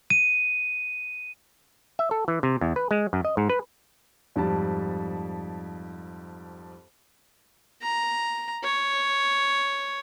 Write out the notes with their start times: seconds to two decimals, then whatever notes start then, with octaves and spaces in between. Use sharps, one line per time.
0.10 D#7
1.99 E5
2.11 A4
2.28 E3
2.43 C3
2.61 E2
2.76 B4
2.91 G#3
3.13 F#2
3.25 D#5
3.37 G#2
3.50 B4
4.36 F2 G#2 G3 A5
7.82 A#5
8.64 C#5